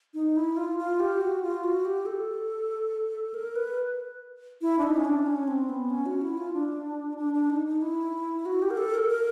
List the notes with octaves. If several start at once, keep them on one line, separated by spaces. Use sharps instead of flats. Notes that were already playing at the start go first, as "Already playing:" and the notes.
D#4
E4
F4
F4
G4
F#4
F4
F#4
G4
A4
A#4
B4
E4
D4
D#4
C#4
D4
C#4
C4
B3
C#4
F#4
E4
F4
D4
D4
D4
D#4
D#4
E4
F#4
G4
A#4
A4
A#4
A#4